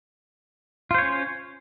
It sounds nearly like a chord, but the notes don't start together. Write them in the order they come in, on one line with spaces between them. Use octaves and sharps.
F4 C5 C#5 C#4